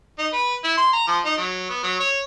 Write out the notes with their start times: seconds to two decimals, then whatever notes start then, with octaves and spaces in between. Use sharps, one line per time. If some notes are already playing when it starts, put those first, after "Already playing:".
0.18 D#4
0.33 B4
0.64 E4
0.77 C6
0.93 A#5
1.07 F3
1.25 D#4
1.37 F#3
1.70 B3
1.83 F#3
2.00 C#5